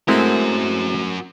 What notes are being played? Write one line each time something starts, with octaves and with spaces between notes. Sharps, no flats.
G#3 A3 C4 D#4 E4 F#4 A#4